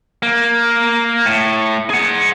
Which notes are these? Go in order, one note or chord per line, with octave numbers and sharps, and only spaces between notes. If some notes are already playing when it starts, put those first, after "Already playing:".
A#3
A2
G#4 F#5